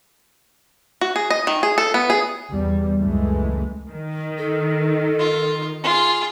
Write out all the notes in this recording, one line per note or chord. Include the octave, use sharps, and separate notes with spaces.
F#4
G#4
D#5
D#3
G#4
A4
B3
G#4
E2 G3
C#2 F#2 E3 G#3 A3
D#3
A4
F4
F4 G#4